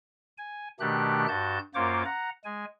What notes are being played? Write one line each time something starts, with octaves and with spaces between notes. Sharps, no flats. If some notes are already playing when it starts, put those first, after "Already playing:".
G#5
B2 D#3 A3 D4 G4 F#6
G2 F#4 A5 G6
F#2 A#3 F4 C5 C#5 D6
F#5 A#5
G#3 G#5